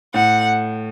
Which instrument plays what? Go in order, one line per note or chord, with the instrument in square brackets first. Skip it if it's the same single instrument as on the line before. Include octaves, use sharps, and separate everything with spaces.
[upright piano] A2 [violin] F#5